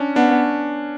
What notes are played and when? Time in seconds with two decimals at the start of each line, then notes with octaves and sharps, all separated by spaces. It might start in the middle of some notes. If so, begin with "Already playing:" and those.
Already playing: C#4 D4
0.16 B3 D4